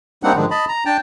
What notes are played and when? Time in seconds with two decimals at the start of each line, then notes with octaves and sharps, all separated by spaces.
0.23 G3 A#3 C4 D4 D#4 F#5
0.36 G#2 D3 D#3 F3 G#3 D4
0.51 D#5 A5 B5
0.68 A#5
0.86 D4 G5 A5